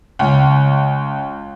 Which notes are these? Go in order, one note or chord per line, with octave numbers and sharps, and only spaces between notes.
C#2